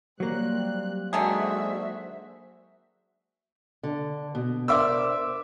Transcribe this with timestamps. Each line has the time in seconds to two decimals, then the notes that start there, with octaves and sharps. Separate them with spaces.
0.20 F#3 G3 A#3 C4 F#6
1.13 D3 D#3 G#3 F#4 G#4 C5 E5
3.83 D3
4.35 B2
4.68 D4 A#4 C5 E5 D6 E6